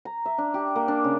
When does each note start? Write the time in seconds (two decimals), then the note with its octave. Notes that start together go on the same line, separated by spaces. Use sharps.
0.05 A#5
0.26 E5
0.38 D4
0.54 G4
0.75 A#3
0.88 D4
1.04 C#3